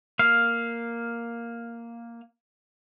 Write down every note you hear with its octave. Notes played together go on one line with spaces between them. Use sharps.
A#3 F5